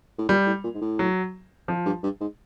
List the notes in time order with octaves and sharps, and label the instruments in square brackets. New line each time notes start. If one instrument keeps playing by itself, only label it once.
[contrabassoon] A2
[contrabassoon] A#2 [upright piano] G3
[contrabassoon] A2
A#2
G#2
A2
[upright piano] F#3
[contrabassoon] F2 [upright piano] F3
[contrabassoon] G2
G2
G#2